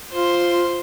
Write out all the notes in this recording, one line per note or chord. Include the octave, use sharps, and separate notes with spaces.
F4 C5